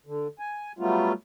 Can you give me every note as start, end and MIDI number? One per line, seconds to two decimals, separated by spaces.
0.06 0.27 50
0.39 0.72 80
0.79 1.12 54
0.79 1.12 55
0.79 1.12 57
0.79 1.12 59
0.79 1.12 65